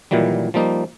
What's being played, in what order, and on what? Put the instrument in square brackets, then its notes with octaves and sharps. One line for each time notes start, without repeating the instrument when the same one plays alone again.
[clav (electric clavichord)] A#2 D#3 E3 F#3 G3
F3 G3 A#3 D#4